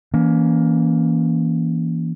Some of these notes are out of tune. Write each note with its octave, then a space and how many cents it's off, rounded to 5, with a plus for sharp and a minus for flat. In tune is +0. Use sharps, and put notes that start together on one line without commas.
E3 +0 A#3 +15 C#4 +25